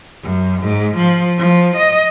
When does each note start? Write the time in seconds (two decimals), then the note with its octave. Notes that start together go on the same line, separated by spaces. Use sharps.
0.23 F#2
0.62 G#2
0.97 F3
1.38 F3
1.77 D#5